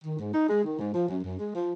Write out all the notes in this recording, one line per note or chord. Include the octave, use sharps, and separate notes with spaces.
D#3
G#2
D#4
G#3
D#3
G#2
F3
F#2
F#2
G#3
F3